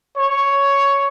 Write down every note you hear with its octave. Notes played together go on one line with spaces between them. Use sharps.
C#5